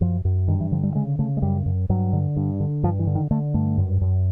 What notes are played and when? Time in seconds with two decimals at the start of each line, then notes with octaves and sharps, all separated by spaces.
0.01 F#2 F3
0.25 F#2
0.48 G2 D#3
0.60 E3
0.72 D3 F3
0.83 G3
0.95 C#3 G#3
1.19 C#3 A3
1.37 G#3
1.42 F#2 G3
1.66 F#2
1.89 G2 F#3
2.13 D3
2.37 G2
2.60 D3
2.83 G2 F3
2.99 E3
3.07 D3
3.15 D#3
3.31 D3 A3
3.54 G2 A3
3.78 F#2
4.01 F#2